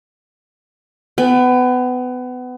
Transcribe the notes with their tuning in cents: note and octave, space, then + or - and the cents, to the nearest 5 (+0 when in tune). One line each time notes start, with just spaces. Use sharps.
B3 +25 G#5 -40